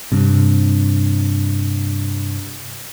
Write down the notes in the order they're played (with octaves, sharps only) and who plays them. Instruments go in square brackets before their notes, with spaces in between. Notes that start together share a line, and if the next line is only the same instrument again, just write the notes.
[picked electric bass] G2 C3